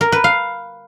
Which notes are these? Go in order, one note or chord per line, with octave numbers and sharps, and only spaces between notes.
A#4
B4
F5